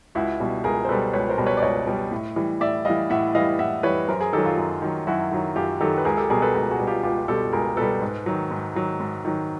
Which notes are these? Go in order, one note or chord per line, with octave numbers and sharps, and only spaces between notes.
C#2 E4 F#4
B2 G3
C#2 G#4 A#4
C5
B2 G3 A4 B4
C#2 B4 C#5
A#4 C5
B2 G3
B4 C#5
D5
C#2 C#5 D#5
B2 G3
A2
E3 G3
A2 D5 E5
E3 G3 D#5 F5
A2 E5 F#5
E3 G3 D#5 F5
A2 E5 F#5
E3 G3 B4 C#5
F#2 A#4 C5
G#4 A#4
D#3 F#3 G4 A4
F4
F#2
D#3 F#3
F#2 E4 F#4
D#3 F#3
F#2 F4 G4
D#3 F#3 G4 A4
B4
C#2 G#4 A#4
G4 A4
B2 G3 G#4 A#4
A4 B4
C#2 G#4 A#4
F#4 G#4
B2 G3
F4 G4
C#2 F4 G4
B2 G3 G4 A4
C#2 G#4 A#4
B2 G3 A4 B4
G#2
D#3 F#3
G#2
D#3 F#3
G#2
D#3 F#3